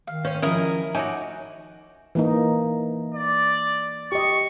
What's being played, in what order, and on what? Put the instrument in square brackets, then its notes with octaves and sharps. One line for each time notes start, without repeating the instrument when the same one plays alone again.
[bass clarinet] D#3 [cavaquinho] F5
[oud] C#4 [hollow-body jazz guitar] C5
[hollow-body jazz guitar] F3 C#4 [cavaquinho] E4 G#4 D#5 [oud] A#4
[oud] D#4 [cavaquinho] F#4 D6 [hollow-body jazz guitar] C#5 E5 G#5
[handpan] E3 A#3 D#4
[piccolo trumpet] D5
[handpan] G4 D#5 [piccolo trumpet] C#6